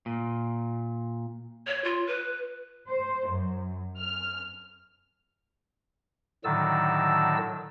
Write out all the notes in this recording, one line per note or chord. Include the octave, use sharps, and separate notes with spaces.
A#2
C#5
F4
B4
C5
F#2
F6
A2 D3 D#3 F#3 A5 E6